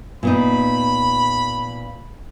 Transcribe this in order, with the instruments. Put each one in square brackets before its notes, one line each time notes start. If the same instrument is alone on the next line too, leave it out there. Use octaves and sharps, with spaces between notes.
[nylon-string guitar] A#2 B3 D#4 [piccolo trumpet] B5